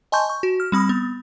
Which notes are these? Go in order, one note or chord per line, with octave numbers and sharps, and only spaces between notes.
D#5 G#5 A5 C6 C#6 G6
C#6
F#4
F6
G3 C4 B5 D#6
B3